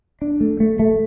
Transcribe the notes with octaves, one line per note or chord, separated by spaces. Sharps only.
D4
A3
A3
A3